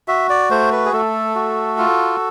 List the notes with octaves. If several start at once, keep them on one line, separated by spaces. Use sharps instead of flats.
F#4 E5
D5
A3 C5
B4
G#4
A3 A4
F#4
F4